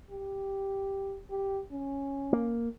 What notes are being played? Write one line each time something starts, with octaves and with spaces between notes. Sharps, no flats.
G4
G4
C#4
A#3